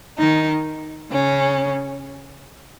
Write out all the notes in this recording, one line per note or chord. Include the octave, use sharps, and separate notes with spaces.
D#3 D#4
C#3 C#4